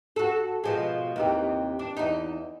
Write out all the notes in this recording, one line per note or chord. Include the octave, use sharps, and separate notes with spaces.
F#4 A4
B2 F3 G#3
D#2 C3 E3
D4
E2 D#4